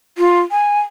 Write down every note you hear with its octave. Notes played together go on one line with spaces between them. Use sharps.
F4
G#5